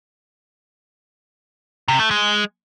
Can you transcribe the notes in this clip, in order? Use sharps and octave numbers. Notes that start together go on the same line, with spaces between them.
C3
A3
G#3